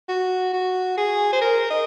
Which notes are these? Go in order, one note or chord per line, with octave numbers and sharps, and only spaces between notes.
F#4
F#4
G#4
C5
A#4
D#5